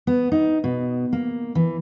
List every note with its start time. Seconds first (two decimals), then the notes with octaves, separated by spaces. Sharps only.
0.07 B3
0.32 D#4
0.64 B2
1.13 A#3
1.55 E3